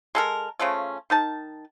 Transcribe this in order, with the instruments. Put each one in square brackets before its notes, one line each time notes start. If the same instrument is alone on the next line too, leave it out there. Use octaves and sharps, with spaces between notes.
[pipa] G#3 A4 A#4
C#3 F3 A3 C#4
D#3 D#4 A5